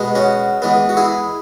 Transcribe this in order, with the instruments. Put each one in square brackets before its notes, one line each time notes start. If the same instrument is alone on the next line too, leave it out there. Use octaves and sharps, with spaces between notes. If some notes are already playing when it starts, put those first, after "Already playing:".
Already playing: [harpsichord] B2 G#3 B3
C#4 F#4
E3 G#3 B3
F#4
E4 G#4